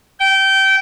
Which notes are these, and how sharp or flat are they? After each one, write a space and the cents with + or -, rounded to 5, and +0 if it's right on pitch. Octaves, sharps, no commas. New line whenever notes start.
G5 -20